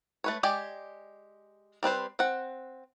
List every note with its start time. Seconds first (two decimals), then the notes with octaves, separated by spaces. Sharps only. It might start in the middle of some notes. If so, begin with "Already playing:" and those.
0.24 A3 B4 C#5
0.43 G#3 G4 D5 G5 G#5
1.83 G3 C4 B4 C5
2.19 C4 F#5